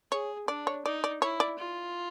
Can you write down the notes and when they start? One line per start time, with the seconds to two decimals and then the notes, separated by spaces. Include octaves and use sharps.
0.11 G#4 C#5
0.48 D4 D5
0.67 C#5
0.85 D#4 D5
1.04 D5
1.22 E4 C#5
1.40 D5
1.58 F4